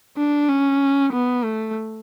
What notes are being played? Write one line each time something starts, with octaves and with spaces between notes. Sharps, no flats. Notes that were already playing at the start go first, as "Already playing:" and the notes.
D4
C#4
B3
A3